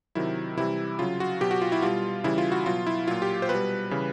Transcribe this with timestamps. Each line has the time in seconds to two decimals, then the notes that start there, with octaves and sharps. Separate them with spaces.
0.15 C3 D#3 F#3 E4
0.57 C3 E3 G3 E4
0.99 C#3 F#3 F4
1.20 F#4
1.41 B2 F#3 G4
1.51 F#4
1.62 F4
1.72 E4
1.82 B2 G3 F4
2.24 C#3 E3 G3 E4
2.38 F4
2.52 F#4
2.66 B2 F#3 F4
2.86 E4
3.08 A#2 F#3 F4
3.22 G4
3.42 C5
3.49 B2 B4
3.55 G3
3.91 C#3 E3 G3